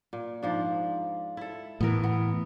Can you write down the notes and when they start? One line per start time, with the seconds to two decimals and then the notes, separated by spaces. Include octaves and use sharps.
0.13 A#2
0.43 G#2 F3 D4
1.37 E4 A4
1.81 A2 E3 B3 A#4
2.04 B3